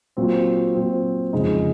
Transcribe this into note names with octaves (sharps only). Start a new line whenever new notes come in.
A#2 F#3 C4
A#2 F#3 C4
F2 C#3 G#3 D#4